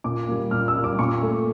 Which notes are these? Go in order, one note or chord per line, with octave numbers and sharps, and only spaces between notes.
A#2 D6
G3 A#3
A#2 F6
E6
G3 A#3
D6
A#2 C#6
A3